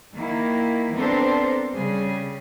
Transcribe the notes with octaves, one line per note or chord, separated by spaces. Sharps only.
D#3 A#3 E4
B3 C4 D4 A4 A#4 C5
C#3 G3 G#4